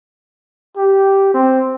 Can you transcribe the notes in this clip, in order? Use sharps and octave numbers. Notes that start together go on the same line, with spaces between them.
G4
C4